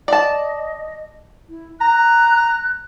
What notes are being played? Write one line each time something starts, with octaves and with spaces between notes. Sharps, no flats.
D5 D#5 A5
E4
A#5 F#6